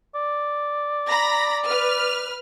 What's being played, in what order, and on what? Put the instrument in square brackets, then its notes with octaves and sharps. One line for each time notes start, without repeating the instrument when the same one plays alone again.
[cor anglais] D5
[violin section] A#5 B5 A#6
B4 F6